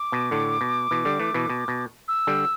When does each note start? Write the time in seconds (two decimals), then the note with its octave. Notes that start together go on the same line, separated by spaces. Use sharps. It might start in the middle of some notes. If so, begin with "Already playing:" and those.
Already playing: D6
0.12 B2
0.31 A2 D3
0.61 B2
0.91 B2 E3
1.05 D3 G3
1.20 E3 A3
1.34 B2 E3
1.50 B2
1.68 B2
2.08 E6
2.27 D3 G3